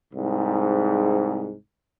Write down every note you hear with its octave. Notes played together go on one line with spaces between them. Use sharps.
C2 G#2